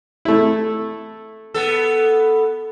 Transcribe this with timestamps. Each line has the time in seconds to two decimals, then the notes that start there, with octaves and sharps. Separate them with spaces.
0.25 A3 E4
1.54 B3 A4